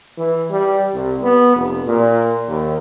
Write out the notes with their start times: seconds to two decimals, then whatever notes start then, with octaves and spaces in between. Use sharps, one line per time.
0.18 E3
0.50 G3
0.94 C2
1.22 B3
1.55 F1
1.86 A#2
2.48 D#2